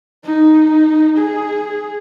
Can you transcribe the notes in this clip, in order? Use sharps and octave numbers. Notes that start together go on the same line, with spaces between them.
D#4
G#4